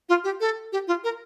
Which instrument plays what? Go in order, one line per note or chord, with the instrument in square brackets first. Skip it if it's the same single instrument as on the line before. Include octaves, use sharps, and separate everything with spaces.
[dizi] F4
G4
A4
G4
F4
A#4